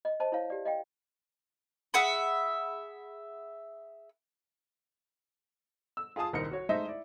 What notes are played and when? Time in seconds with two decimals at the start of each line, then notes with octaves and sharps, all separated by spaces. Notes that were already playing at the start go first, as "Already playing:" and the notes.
0.05 D#5
0.20 C5 D#5 A5
0.32 E4 C#5 F5
0.50 G4 D5
0.65 D#5 F5 G5
1.94 G#4 E5 F#5 B5
5.97 E6
6.16 F4 G#4 G#5 A5 D#6
6.33 D#1 C2 D#4 A#4 C5 C#7
6.51 F#4 C#5
6.69 G#3 A3 D#4 C5 D#5 E5
6.86 E4 D5